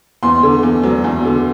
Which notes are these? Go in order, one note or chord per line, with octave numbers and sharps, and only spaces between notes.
E2 C6
D3
E2
F#3
E2
D3